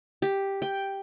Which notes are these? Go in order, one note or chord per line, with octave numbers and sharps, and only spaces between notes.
G4
G5